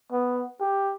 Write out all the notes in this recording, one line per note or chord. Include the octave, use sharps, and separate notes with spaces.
B3
G4